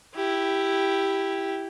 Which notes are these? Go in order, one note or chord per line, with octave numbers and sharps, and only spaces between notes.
E4 G4